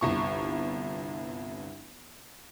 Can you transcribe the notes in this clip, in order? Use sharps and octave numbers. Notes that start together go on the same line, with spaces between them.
G1 C2 C#6